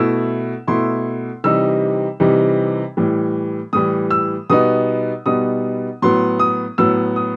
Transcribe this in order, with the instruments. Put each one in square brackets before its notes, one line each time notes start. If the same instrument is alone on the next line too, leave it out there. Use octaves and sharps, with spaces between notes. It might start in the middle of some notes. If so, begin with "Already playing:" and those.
Already playing: [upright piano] B2 A3 E4 E6
B2 A3 E4 C6
C3 E3 G3 D#4 E6
C3 E3 G3 D#4
A2 E3 G3
A2 E3 G3 D#6
E6
B2 G3 B3 D#4 D#6
B2 G3 B3 D#4 D#6
A2 F#3 B3 C6
D#6
A2 F#3 B3 E6
D#6